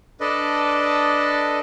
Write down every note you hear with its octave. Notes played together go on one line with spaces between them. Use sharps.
D4 A4 B4 D5 D#5